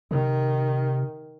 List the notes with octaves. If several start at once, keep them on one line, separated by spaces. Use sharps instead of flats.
C3 D#3